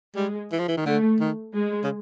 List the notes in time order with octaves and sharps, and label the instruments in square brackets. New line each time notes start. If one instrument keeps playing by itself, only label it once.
[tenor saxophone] G3 [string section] G#3
[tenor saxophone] E3
F3
E3
D#3
[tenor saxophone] D3 [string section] A3
[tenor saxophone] D#3
[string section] G#3
[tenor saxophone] C#3